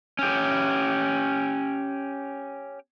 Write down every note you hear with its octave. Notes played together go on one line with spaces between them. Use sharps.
C#4 G4